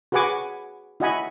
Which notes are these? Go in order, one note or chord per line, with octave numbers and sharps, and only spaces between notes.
F#4 G#4 B4 F#5 G#5 D6
E4 F#4 D#5 F#5 G#5 B5